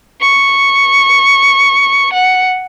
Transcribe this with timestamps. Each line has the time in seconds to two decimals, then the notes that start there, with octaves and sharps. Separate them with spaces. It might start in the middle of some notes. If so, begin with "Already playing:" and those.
0.21 C#6
2.13 F#5